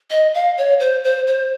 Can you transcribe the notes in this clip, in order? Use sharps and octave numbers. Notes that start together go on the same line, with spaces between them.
D#5
F5
C#5
C5
C5
C5